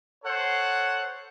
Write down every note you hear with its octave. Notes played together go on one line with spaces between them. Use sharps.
A4 C5 C#5 F#5